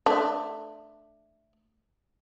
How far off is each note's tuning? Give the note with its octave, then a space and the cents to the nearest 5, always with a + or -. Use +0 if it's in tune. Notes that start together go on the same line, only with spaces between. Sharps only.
A3 +0 D4 +15